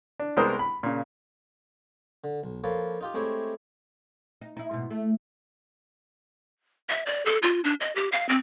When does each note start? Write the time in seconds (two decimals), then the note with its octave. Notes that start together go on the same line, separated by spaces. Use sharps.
0.19 D4
0.37 C2 G#3 B3 A#4 C5 D#6
0.59 B5
0.83 A#2 C#3
2.24 D3
2.43 B1
2.64 F3 A#3 A4 B4 C#5
3.01 D#4 F4 G4
3.14 G#3 A3 C4 E4 G4 C#5
4.41 D#4
4.57 D#4 E4
4.71 G#2 B2
4.90 A3
6.89 E5
7.06 D5
7.26 A4
7.42 F4
7.64 D4
7.81 D#5
7.96 G4
8.12 F5
8.29 C4